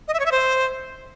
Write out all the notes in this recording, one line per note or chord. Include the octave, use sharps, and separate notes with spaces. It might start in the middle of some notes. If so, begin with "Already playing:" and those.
D#5
E5
C#5
E5
C5